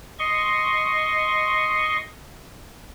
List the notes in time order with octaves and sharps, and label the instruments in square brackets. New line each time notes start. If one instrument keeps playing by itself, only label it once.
[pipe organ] D#5 C6 C#6